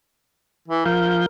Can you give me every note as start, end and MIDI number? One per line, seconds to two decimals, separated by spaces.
0.68 0.85 52
0.85 1.26 53
0.85 1.24 70
0.85 1.26 77
0.85 1.26 91